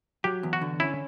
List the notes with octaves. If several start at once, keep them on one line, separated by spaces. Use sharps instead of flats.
F#3 G4
E2
F#4
D3
C#4 E4